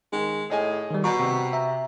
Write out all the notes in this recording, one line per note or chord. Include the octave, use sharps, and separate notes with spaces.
D#3 G#3
A2 G#4 D#5 G#5
D#3 G3
B2 A#5 C#6
C3
E5 A#5